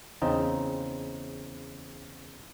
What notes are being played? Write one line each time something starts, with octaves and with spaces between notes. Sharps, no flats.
E2 C#3 C4 D#4